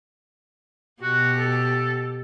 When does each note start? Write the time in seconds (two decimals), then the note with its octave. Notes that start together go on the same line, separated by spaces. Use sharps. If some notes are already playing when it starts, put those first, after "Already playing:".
1.02 B2 F#4 G4
1.39 A4